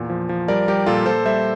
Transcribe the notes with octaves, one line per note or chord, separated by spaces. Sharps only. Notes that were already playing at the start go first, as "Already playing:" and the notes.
Already playing: E2 A#2
F3
F3
G3 A#4 D5
G3 G4 A#4
A#2 F4 A4
A#2 A4 C5
G3 C5 E5